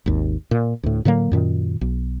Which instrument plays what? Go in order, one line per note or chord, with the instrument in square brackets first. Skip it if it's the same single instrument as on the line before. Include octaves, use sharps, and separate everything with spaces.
[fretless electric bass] G#1 D#2
A#2
D2 A2
A2 D3 F#3 A#3
F#2 A#2 D#3
B1